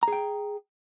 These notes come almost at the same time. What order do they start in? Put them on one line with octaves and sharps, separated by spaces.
A#5 G#4 G5